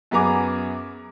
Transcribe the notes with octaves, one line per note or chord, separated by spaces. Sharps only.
F#2 B3 G#4 G#5 A#5 D6